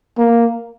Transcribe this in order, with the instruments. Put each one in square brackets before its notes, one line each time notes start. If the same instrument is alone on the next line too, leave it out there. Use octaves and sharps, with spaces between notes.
[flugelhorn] A#3